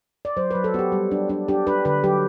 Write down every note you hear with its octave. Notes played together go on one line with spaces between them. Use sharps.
D5
F#3 C5
F#3 B4
A4
B3 F#4 G4
G3
D4
D4
D4 G4
D4 B4
D3 B4
F#3 G4